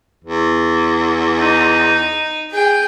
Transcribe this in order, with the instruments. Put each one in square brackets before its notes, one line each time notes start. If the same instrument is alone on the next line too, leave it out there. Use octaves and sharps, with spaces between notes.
[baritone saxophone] E2
[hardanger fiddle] D#4
G#4 G5